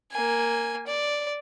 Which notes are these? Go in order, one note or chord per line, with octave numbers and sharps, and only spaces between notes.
A#3 G#5
D5